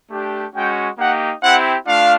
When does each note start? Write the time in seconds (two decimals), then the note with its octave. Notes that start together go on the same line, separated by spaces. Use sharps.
0.11 A3 D4 G4
0.54 G#3 C#4 F#4 G5
0.98 A#3 D#4 G4 F#5
1.42 C4 E4 G4 F#5
1.86 A3 D4 F4 F5